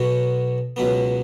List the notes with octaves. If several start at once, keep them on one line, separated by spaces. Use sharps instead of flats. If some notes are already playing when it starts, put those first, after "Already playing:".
Already playing: B1 B2 B3 F#4 C#5
C#2 B2 F#3 B3